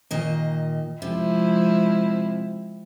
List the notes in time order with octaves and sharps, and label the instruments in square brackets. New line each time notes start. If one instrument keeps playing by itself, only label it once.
[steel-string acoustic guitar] A#2 D#3 D#5
[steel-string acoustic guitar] C3 [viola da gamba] F3 G#3 E4